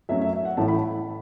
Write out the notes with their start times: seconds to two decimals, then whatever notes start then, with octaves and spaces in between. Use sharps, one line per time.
0.09 F#2 F#3 A3 C#4 E5
0.22 E5
0.33 E5
0.45 F#5
0.57 A1 A2 E3 A3 A5
0.68 B5